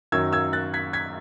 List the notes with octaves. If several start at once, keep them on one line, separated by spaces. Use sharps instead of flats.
F#2 D#3 F#3 E6 G#6
E6 G#6
F#6 A6
G#6 B6
G#6 B6